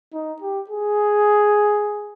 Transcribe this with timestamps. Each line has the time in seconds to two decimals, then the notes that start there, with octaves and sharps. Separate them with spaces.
0.13 D#4
0.42 G4
0.70 G#4